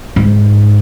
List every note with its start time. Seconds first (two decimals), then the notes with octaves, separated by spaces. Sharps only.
0.16 G#2